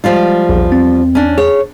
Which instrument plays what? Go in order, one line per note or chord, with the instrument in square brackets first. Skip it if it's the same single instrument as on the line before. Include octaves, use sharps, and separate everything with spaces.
[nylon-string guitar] F3 G3 F4 [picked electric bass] G#3
[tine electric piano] A#1 [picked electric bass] E2
[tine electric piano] C4
[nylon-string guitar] C#4 D4
[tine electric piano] G#4 [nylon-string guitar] C#5